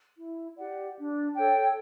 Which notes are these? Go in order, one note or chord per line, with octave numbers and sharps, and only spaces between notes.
E4
G4 D5 F#5
D4
A4 C#5 G5